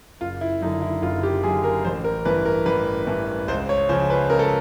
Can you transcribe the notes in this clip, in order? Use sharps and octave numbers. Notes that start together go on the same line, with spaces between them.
F#1 F4
E4
F#2 D3 D#4
E4
F#1 F4
G4
F#2 D3 G#4
A#4
A1 C5
A#4
G2 E3 B4
A#4
A1 B4
G2 E3
C#2 C5
C#5
C#3 F3 C5
B4
C#2 A#4
A4